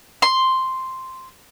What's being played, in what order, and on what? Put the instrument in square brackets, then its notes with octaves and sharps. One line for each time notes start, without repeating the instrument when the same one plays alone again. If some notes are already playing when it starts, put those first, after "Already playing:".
[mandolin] C6